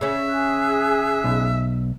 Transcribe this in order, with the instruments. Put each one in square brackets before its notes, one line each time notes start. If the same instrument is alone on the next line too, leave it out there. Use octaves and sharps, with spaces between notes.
[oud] C#3 C#4 [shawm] E5
[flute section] G#4 F#6
[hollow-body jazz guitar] B1